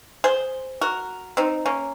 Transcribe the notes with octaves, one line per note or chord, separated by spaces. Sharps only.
G#4 C5
F#4 A#4
C4 D#4
A#3 C#4